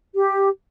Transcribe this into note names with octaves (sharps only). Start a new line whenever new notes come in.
G4